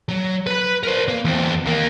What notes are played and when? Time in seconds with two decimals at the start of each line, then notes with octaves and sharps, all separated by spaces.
0.09 F#3
0.47 B4 B5
0.83 A#4 C5
1.08 A#3
1.25 E2 C4
1.66 D#2 A#3